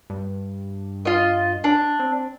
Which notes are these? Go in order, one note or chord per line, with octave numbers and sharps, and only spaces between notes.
G2
F4 D#5
D4
C4